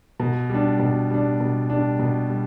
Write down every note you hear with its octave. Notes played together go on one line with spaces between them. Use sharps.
B2
G3 D4
B2
G3 D4
B2
G3 D4
B2
G3